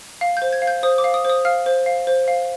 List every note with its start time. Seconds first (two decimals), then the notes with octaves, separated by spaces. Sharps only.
0.21 F5
0.37 C5 G6
0.53 G#6
0.62 F5
0.67 G6
0.83 C5 D#6
0.98 D6
1.04 F5
1.14 D#6
1.25 C5 D#6
1.45 F5 F6
1.66 C5
1.86 F5
2.07 C5
2.28 F5